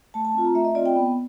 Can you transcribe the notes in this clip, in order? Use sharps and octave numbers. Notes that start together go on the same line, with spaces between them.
A3 A5
A5
C4 F4
A#5
A3 E5
D#5
C4 F4 D5
G5
B3